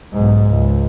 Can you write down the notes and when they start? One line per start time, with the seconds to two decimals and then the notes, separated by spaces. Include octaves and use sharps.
0.13 B1 G#2
0.49 C#2